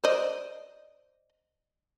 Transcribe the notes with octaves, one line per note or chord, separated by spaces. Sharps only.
C5 D5 D#5